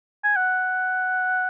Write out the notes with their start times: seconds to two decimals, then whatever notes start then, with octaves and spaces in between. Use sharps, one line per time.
0.24 G#5
0.36 F#5